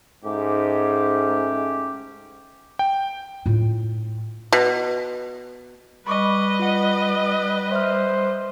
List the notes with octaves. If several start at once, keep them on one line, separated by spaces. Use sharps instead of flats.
G#2 A3 C#4 G4
G5
A2 F4
B2
G3 B4 D#5 B5 C#6 D6
F4 F#5
C5 E5 F6